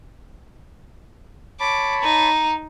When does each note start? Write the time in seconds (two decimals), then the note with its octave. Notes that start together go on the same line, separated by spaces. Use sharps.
1.60 C#5 A5 B5 D6
2.02 D#4 A#5